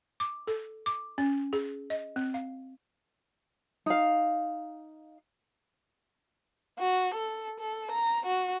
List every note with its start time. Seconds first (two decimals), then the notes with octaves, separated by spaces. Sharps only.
0.20 D6
0.47 A4
0.86 D6
1.18 C#4
1.53 G#4
1.90 D#5
2.16 C4
2.34 F5
3.86 D#4 F5
6.79 F#4
7.15 A4
7.60 A4
7.92 A#5
8.26 F#4